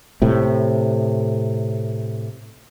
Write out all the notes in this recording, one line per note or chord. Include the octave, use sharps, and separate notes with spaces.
A2 C3